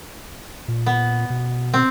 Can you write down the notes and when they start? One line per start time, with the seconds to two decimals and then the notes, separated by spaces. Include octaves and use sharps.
0.68 A#2
0.86 B3
1.30 B2
1.74 C4